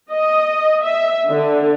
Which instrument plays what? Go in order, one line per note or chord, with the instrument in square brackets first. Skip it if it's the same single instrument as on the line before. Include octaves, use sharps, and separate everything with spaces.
[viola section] D#5
E5
D3